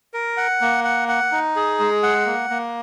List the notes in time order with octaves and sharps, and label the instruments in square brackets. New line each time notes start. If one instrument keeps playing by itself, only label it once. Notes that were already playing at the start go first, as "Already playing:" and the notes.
[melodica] A#4
F#5
A#3
F#5
F#5
D#4
G#4
G#3
F#5
A#3
A#3